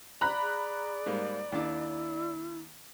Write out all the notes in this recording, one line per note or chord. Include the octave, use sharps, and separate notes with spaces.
D5 A#5 B5 F#6
G#4
G#2 G3 A#3
D#2 D4 E4 D6